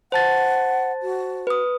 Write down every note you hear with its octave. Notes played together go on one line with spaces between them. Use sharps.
C5 F#5 A5 A6
F#4
B4 D#6